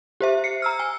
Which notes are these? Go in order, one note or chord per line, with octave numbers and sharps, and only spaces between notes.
G4 C5 E5
C7 C#7
A#5 E6 F6
G#5